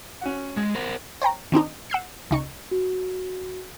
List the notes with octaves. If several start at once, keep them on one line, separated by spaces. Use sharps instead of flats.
C#4 F#4 F#5
G#3 G#6
A#4 C5 F#5
C5 C#5 G5 A#5
D#3 C4 D4 D#4
F#5 E6 G6 C7
C#2 D#4 C#6
F#4